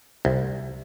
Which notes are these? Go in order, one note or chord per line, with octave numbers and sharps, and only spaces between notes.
C2